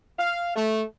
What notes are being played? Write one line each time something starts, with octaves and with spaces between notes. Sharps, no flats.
F5
A3